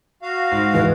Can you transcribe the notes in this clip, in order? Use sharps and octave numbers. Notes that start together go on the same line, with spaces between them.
F#4 F5
G#2
D2 G#2 E3 G#3 B4